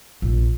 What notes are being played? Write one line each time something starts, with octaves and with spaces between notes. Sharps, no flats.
A#1